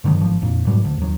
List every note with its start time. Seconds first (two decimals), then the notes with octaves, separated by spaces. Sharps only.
0.04 G2 D3 D#3 F#3
0.20 G#1 F3
0.42 F2 A#2
0.66 G#2 C#3 F#3 G3
0.85 D2
0.97 D#2 F#3